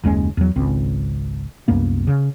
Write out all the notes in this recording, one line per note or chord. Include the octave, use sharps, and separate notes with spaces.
F#1 D#2 G#3 C#4
E2 F#3
G#1 C#2 C4
C2 F#2 A#3 B3
C#3